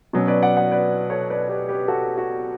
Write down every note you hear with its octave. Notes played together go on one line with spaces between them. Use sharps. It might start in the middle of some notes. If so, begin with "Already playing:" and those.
B2 F#3 C#4
B4 D5
D5 F#5
D5 F#5
B4 D5
A4 C#5
B4 D5
G4 B4
G4 B4
F#4 A4
F#4